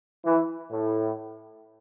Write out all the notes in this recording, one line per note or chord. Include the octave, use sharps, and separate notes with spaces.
E3
A2